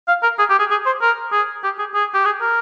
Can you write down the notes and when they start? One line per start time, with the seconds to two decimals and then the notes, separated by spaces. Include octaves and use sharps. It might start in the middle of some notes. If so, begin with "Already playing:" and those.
0.08 F5
0.23 A#4
0.39 G#4
0.50 G4
0.59 G#4
0.71 G#4
0.86 C5
1.02 A#4
1.32 G#4
1.64 G4
1.79 G#4
1.94 G#4
2.14 G4
2.25 G#4
2.41 A#4